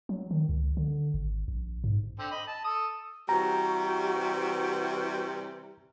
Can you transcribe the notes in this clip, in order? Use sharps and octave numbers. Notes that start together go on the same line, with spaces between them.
F#3
D#3
C#2
D3
G#1
A#1
G#2
D3 C4
D#5 B5
A5
A4 D#6
C3 E3 G3 F#4 A#5